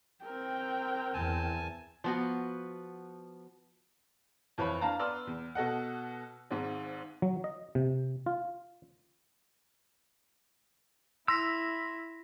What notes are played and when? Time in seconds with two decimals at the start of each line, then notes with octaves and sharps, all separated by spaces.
0.24 C4 A#4 G5
1.14 E2 G#5 A5
2.04 F3 B3 F#4
4.58 F2 E3 C#5 B5
4.81 D4 F5 A5 A#5
4.99 B3 B4 D5 C6 E6 F6
5.27 E2
5.55 B2 A4 D#5 F#5
6.51 G#1 G#2
7.22 F#3
7.44 D#5
7.75 C3
8.26 F4
11.28 E4 C6 E6 A#6 B6